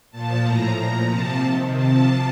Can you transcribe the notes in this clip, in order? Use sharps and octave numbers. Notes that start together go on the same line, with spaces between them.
A#2 F3 A5
A2 F3 A#5
A#2 F3
C3 F3 A5
C3 D#3
C3 F3 A5